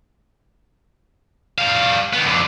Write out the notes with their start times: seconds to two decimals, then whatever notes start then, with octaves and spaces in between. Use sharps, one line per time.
1.58 G3 F5
2.13 D#3 B3
2.25 F2 D3